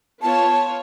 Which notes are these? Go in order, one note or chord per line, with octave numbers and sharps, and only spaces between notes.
B3 F4 C#5 A5